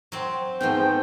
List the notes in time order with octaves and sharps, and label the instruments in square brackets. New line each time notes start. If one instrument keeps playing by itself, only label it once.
[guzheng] F#3 C4
[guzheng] G#2 F3 A3 [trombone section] B3 C4 G#4 [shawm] G5